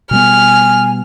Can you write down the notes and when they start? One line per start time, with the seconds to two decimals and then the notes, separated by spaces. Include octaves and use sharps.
0.11 B2 G3 B3 G#5 F6